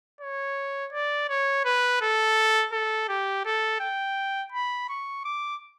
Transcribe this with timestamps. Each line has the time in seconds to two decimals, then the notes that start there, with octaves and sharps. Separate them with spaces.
0.21 C#5
0.93 D5
1.29 C#5
1.65 B4
2.01 A4
2.73 A4
3.09 G4
3.45 A4
3.80 G5
4.52 B5
4.89 C#6
5.25 D6